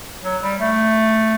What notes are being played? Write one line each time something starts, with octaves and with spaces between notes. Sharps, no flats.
F#3
G3
A3